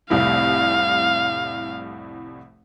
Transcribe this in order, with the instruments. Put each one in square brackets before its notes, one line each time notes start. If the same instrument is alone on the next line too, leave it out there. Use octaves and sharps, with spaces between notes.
[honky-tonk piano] F1 C2 A2 [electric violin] F5